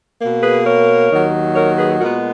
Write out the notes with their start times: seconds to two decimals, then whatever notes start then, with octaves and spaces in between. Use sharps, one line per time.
0.20 B2 A#3
0.43 G#4 B4
0.66 A#4 C#5
1.11 D#2 D#3 F#3
1.56 A#4 C#5
1.78 G#4 B4
2.01 A#2 G#3 B3 F#4 A#4